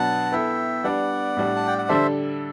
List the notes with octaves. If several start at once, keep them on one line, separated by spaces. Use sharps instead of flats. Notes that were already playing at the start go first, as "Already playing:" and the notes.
Already playing: B2 F#3 B3 D4 F#5 A5
B3 E4 A4 E5 G5
G3 B3 D4 D5 F#5
A2 G3 D4
A5
G5
F#5
D3 G3 D4 A4 C5 E5